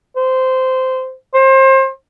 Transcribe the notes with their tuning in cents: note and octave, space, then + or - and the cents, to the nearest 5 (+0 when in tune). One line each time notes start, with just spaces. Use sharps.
C5 -15
C5 +30